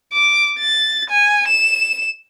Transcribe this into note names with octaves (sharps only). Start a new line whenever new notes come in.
D6
A6
G#5
E7